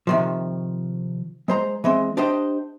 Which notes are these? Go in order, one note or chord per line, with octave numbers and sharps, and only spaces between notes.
C3 D#3 F3
G#3 C5 A#5
E3 G#3 C4
D4 G4 C5 D#5